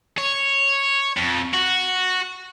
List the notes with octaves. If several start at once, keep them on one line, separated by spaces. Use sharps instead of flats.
C#5
F2
F#4